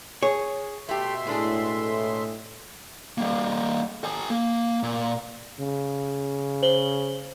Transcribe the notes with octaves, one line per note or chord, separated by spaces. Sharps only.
G#4 C#5
B2 A3 G4 E5 C6
A2 G#3 D4 G#4
G3 A#3
A4 G#5
A#3
A#2
C#3
C5 F#7 G7